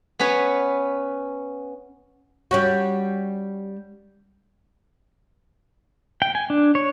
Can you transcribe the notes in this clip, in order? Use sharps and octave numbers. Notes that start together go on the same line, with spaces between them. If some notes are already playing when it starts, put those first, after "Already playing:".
B3 C#4 B4 C#5
G3 C#4 F#4
G5
G#5
D4
C#5